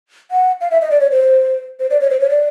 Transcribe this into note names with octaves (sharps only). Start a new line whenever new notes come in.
F#5
F5
E5
D#5
D5
C#5
C5
C5
D5
C#5
C5
C#5
D5